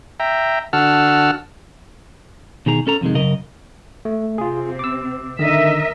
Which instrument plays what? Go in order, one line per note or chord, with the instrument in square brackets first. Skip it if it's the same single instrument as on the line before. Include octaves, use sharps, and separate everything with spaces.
[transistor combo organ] E5 G5 A#5
D3 F#4 F#5 A5 E6 F6
[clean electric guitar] B2 D#3 G#4 A#5
C#4 A4 A#5
F2 C3 D#3 G#3
F#2 C#3 A#4 D#5
[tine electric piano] A3
[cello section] C3 C4 [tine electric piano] F4 G#4
[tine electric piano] D6 E6
[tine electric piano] D3 D#3 [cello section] A#4 D#5 E5